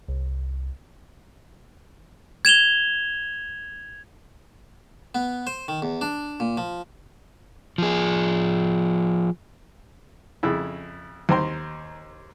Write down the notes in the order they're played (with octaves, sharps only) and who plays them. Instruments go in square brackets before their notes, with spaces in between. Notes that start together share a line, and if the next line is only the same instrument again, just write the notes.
[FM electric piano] C2
[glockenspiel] G#6 E7 F7 G7
[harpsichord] B3
C5
D#3
E2
D4
A#2
F3
[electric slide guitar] F3 G#4
[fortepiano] F2 C#3 E4
D#2 C5 G5 A#5 C6